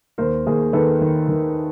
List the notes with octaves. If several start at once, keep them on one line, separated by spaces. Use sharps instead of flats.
D#2 A#4 C5
D#2 G#4 A#4
D#3 A4 B4
D#3
D#3